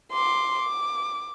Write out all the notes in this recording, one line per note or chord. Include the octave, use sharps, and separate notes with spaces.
C6 D6
D6